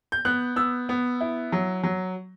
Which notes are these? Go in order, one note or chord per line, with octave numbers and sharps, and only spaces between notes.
G6
B3 F#6
B3 E6
B3
E4
F#3
F#3